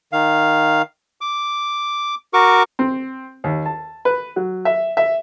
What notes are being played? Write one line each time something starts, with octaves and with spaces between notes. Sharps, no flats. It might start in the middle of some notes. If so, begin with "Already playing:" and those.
D#3 F5
D6
F#4 A#4 C#6 D6
C4
D#2
A5
B4
F#3
E5
E5